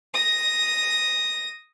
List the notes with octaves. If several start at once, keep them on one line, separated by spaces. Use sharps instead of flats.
D#6 A#6